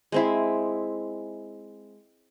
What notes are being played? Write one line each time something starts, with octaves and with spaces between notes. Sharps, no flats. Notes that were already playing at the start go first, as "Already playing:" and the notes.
G#3 C4 E4